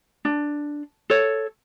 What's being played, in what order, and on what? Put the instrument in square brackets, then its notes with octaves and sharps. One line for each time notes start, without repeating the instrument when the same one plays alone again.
[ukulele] D4
A4 C#5